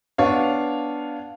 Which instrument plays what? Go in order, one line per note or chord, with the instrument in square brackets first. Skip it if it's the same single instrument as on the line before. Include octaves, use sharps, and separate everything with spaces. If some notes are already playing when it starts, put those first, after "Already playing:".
[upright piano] B3 D4 C#5 F5